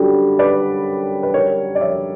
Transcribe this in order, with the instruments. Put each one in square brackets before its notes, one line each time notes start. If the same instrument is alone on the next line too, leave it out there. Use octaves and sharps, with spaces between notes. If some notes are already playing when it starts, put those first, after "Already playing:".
Already playing: [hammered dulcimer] F#2 D3 G3
[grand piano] B4 D5
B4
A#4 C#5
D5
C#5 E5